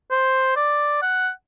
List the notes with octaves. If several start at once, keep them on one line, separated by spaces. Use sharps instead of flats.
C5
D5
F#5